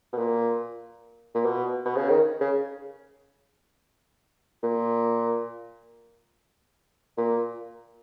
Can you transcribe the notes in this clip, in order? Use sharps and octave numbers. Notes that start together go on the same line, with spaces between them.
B2
A#2
A#2
B2
B2
C#3
D#3
C#3
A#2
A#2